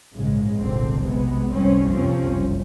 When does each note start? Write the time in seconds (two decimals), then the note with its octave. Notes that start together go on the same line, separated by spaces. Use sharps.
0.16 A#1 G#2 C#3 G#3
0.58 F1 C2 A#2 D3 C4
1.01 B1 C3 G#3 B3
1.53 F1 C2 G3 C4 C#4
1.88 F2 C3 F3 C4 C#4
2.29 F#1 C2